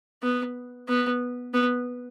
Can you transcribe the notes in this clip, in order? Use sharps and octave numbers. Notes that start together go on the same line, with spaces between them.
B3
B3
B3